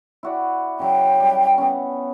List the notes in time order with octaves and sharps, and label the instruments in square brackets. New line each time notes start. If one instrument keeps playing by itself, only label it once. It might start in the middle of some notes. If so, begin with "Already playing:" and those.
[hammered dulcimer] E4 F#4 D5
[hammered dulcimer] C#3 F#3 [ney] G5
[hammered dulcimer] G3
B3 C#4